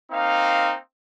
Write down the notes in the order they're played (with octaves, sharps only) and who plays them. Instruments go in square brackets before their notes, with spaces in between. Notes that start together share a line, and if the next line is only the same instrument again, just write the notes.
[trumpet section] A#3 C4 D#4 F5